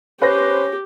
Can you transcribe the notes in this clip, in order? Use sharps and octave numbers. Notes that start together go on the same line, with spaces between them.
C#4 G4 B4 C5 A#6